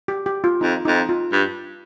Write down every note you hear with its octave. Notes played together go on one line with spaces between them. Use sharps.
G4
G4
F4
F2 D#4
F2 D#4
F4
G2